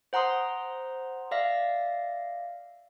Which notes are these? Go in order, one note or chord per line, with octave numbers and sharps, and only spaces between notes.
C5 F#5 A#5 C6 D#6
D5 E5 F5 A#6